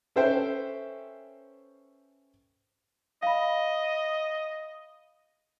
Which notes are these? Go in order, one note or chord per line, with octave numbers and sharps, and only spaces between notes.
C#4 A4 B4 C5 E5 G5
D#5 F5 B5